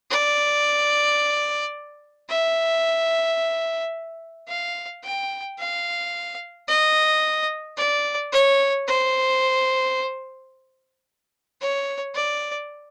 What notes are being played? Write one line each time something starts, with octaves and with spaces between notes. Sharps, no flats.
D5
E5
F5
G5
F5
D#5
D5
C#5
C5
C#5
D5